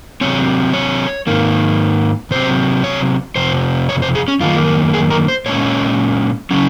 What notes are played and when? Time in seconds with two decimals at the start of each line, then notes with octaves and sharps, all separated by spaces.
0.21 C3 F#3 C4 C#5
0.74 C#5
1.27 G#2 D#3 A#3
2.31 C3 F#3 C4 C5
2.84 C#5
3.36 F2 C3 C5
3.89 C#5
4.02 C5
4.15 G#4
4.28 C#4
4.40 F#2 D#3 A#3 F4
4.94 G#4
5.10 A#4
5.28 C5
5.46 A#2 G#3 C#4 C#5
6.51 C#3 F#3 C#4